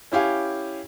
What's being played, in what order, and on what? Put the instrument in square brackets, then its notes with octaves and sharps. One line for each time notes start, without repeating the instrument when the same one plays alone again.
[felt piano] C#4 E4 G4 F5 G#5